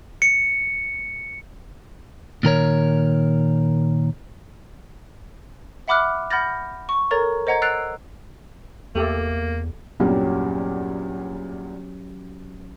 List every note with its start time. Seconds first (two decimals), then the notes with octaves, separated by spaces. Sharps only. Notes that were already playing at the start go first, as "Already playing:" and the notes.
0.22 C#7
2.43 A#2 D#3 A#4 C#5
5.88 E5 F#5 B5 D6 F6 F#6
6.30 F#5 B5 F6 G6 A6 A#6
6.89 C#6
7.11 A4 A#4 C#5 A#5 A6
7.47 C5 D#5 F#5 A#5 G#6
7.62 E6 F#6 A6 C7 D7 F7
8.95 E2 A3 A#3 G4 A4
10.00 E2 G2 A#2 F#3 C#4 G4